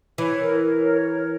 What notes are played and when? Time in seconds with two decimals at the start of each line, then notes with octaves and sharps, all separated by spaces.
0.18 E3 C#5
0.40 A#4
0.62 A#4
0.83 C#5
1.04 A#4